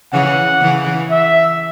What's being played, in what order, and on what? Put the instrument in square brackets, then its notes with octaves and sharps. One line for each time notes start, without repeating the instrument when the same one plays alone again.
[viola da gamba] C#3 E3 [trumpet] F#5
[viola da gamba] C#3 E3
[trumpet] E5